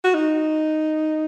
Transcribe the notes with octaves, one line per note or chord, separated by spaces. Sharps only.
F#4
D#4